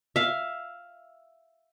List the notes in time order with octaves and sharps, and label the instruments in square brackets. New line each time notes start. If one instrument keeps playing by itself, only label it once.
[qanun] E5 F5